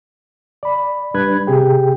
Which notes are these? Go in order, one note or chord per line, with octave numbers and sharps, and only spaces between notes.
D5 B5
G3 D4 B4 B5 F#6 G#6
C3 G4 G#4 G5